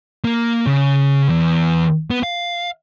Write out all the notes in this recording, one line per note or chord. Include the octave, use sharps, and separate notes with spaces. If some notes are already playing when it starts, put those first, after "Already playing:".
A#3
C#3
E2
B3
F5